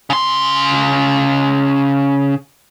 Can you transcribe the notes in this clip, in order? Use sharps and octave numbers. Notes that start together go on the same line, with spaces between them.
C#3 C6